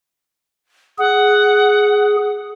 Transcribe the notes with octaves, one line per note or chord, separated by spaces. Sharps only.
G#4 F#5